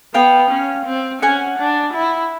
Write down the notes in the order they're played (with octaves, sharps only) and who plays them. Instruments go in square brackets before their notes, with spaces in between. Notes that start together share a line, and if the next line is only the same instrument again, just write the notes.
[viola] B3 [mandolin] F5 G5
[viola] C#4
C4
[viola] C#4 [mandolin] F#5 G#5
[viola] D4
E4